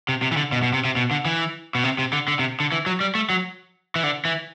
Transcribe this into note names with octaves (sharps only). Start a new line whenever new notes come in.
C3
C3
E3
D3
B2
B2
C3
C3
B2
D3
E3
B2
C3
C3
D3
D3
C3
D3
E3
F#3
G3
A3
F#3
E3
D3
E3